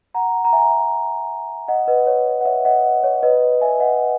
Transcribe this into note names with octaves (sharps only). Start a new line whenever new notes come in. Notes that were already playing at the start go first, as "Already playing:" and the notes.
F#5 A#5
A#5
E5 G#5
D#5 F#5
B4 D#5
C#5
F#5
C#5 E5
D#5 F#5
C#5
B4 D#5
E5 G#5
D#5 F#5